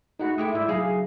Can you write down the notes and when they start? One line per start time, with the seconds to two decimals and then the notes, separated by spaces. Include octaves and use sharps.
0.19 G#3 A3 D#4 F#4 F#5 B5
0.38 G#3 E4 A4 G5 D6 D#6
0.53 G#2 G3 E4
0.69 C#3 F#3 D#4 G#4 F5